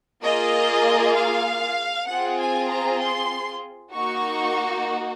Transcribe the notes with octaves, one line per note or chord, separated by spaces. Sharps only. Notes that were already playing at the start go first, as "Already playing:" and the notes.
A#3 F4 G#4 D#5
F5
C4 F4 G#4 F#5
G#5
A#5
C6
A#3 D#4 F#4 C#6